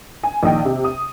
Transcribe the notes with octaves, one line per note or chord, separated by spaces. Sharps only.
G#5
A#1 D#3 D#5 G5
C3
D#6